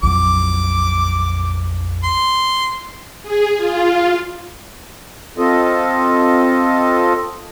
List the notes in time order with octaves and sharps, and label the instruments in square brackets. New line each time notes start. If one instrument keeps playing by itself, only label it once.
[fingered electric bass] A#1 F2 F#3 [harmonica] D6
[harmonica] C6
[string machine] G#4
F4
[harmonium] C4 F4 A4 D#5